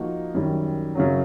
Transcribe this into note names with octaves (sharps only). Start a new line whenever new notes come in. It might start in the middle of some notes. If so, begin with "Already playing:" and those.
Already playing: F3 A#3 D#4 F#4
F#2 D#3 G3
F#2 C#3 F#3